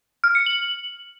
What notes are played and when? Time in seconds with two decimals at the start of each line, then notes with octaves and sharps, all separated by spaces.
0.24 F6
0.35 C#7
0.46 F#7